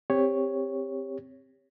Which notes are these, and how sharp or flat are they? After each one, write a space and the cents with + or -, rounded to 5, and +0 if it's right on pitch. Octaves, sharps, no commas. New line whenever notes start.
C4 +0 G4 +20 C#5 +0